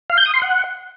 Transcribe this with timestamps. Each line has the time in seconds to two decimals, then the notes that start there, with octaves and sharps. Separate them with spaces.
0.10 F5
0.18 G6
0.26 D#6
0.34 C6
0.42 F#5